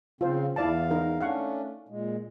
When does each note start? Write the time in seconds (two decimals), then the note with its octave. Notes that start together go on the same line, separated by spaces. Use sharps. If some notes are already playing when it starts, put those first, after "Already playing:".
0.21 C#3 C4 F4 C5
0.56 E2 E4 D5 F5 A5
0.91 D#4 A#4
1.20 A3 C#4 D4 F5 F#5 C#6
1.89 A#2 G#3